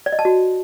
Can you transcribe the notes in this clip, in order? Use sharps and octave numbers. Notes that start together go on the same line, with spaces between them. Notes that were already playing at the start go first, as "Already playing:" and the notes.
D5
D#5
A5
F#4